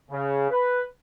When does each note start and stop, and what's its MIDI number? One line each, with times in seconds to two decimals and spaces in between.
0.11 0.47 49
0.51 0.82 71